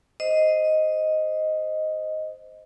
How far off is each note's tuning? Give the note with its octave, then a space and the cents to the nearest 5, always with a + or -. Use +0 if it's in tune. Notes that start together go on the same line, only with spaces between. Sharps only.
C5 -10 D#5 +0